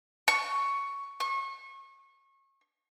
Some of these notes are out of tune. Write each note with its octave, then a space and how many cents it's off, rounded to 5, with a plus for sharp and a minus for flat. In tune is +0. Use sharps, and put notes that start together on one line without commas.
C#6 +10
C#6 -30